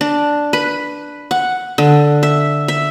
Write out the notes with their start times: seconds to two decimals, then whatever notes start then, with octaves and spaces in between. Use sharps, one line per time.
0.01 D4
0.53 B4
1.31 F#5
1.78 D3
2.23 E5
2.68 E5